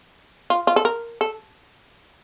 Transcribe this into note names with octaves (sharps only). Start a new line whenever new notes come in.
F4
F4
A4
A#4
A4